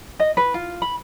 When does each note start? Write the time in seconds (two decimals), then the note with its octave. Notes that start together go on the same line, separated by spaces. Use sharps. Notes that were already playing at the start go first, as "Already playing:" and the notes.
0.20 D#5
0.37 B4
0.54 F4
0.82 B5